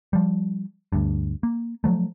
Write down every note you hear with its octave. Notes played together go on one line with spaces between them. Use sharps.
F3 G3
D2 G2
A#3
F3 F#3 A3